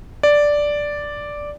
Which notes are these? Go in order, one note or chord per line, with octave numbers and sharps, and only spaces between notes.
D5